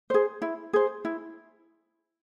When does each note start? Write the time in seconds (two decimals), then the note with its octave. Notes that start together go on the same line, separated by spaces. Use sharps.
0.10 G#4 C5
0.42 E4
0.73 G#4 C5
1.05 E4